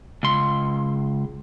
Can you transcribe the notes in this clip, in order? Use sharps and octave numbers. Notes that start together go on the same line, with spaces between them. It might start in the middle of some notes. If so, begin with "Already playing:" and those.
C#2 C6